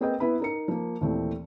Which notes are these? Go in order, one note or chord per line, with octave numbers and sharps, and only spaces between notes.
A#3 C4 G#4 B4 D#5 G5
B3 E4 B4 B5
D#4 A#4 C#7
F3 A#3
D#2 A#2 E3 A3 C4